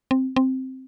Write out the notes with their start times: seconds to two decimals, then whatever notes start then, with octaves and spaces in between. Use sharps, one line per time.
0.11 C4
0.36 C4